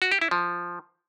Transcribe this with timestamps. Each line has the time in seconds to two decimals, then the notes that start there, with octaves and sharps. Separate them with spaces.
0.02 F#4
0.12 G4
0.21 E4
0.31 F3